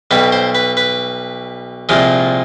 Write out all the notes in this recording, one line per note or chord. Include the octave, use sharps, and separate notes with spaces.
B1 B2 G3 B4
C5
B4
B4
C2 A#2 F3 G#3